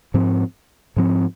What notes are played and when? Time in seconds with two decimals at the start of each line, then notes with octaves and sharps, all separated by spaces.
0.14 G#2 F3 C4
0.96 G#2 F3 C4